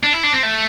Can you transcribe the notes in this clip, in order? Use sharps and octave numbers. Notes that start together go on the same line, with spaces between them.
D4
E4
D4
C4
A3